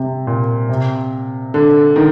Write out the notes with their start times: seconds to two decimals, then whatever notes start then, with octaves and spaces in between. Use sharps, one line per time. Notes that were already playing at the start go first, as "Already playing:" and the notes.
Already playing: C3
0.27 A#2
0.69 C3
1.54 D3
1.96 D#3